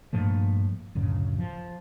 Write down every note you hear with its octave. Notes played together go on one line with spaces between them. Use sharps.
G2 A#2 F3 A3
D1 F#2 C#3
F3